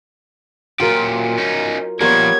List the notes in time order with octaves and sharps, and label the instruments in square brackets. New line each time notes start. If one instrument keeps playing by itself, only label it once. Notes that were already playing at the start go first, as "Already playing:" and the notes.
[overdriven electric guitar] A#2 G4 [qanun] F#3 [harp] F4 A#4
[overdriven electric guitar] C#4 D#4
[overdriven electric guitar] F3 A#3 [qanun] G3 B3 [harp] A#4 C#5 [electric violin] G#6